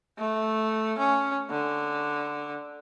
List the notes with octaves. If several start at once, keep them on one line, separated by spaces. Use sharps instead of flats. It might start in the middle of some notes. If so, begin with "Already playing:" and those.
A3
C#4
D3